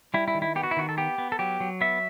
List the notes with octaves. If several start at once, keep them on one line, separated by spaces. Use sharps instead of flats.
G3 E4
E4
D#3
E4
B3 G4
F#4
E4
D#3 F#4
A4
B3 G4
B3
A4
F#3 G4
F#3
B3 E5